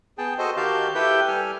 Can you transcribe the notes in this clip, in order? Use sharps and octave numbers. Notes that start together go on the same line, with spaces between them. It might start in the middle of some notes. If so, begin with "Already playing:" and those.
B3 G#4 G5 A5
F#4 A4 C5 D#5
D#3 F#4 G4 F5 A5 G6
E4 G4 A4 B4 G5 G6
G3 A4 G#5 F6